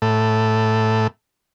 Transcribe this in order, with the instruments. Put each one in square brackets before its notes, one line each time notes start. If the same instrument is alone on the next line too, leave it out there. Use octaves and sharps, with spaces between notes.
[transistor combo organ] A2